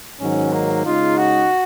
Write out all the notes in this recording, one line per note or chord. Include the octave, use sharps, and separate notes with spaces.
G#2 D#3 F#3 C#4
A#3
C#3 G#3 D#4 F4
F#4